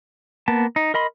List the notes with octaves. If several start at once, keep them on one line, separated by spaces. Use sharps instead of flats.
A#3 B3 A5
D#4
A#4 D#5 B5 C6